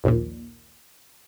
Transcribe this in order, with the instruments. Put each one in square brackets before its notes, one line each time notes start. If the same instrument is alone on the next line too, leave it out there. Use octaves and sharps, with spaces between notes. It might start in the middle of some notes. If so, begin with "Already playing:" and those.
[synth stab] A#1 D#2 A#2